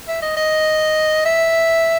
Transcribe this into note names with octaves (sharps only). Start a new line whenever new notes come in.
E5
D#5
D#5
E5